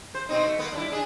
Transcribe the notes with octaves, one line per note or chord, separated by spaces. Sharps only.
C5
B2 C4 D#4
A3
A#3 B3
G3 D4 E4
D4 G#4